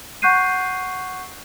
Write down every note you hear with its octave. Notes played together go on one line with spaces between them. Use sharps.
F#5 C#6 F#6 G6 C7 D#7